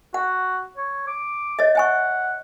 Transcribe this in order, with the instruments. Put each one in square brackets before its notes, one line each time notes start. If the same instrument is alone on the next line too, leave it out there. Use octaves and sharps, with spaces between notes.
[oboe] F#4 [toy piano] F#5
[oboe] C#5
D6
[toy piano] C#5 D#5 E5
[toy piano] E5 G#5 C#6 [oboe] F#5